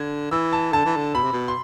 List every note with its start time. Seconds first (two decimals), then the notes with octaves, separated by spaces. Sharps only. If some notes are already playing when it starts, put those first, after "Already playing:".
Already playing: D3 G#6
0.31 E3 E6
0.53 A5
0.72 D3 A5
0.85 E3
0.97 D3
1.14 B2 B5
1.23 C3
1.33 B2
1.48 C6